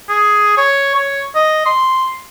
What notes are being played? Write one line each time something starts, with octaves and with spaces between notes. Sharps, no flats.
G#4
C#5
C#5
D#5
C6